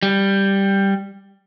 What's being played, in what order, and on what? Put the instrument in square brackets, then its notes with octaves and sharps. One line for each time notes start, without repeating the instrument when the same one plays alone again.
[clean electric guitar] G3